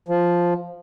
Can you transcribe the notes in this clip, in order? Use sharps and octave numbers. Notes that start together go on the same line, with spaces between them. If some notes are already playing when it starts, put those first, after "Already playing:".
F3